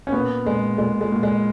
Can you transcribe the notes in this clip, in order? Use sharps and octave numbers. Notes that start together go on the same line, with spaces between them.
C#4
A#2 B3
A#2 G#3
A#2 G#3
G#3
A#2
G#3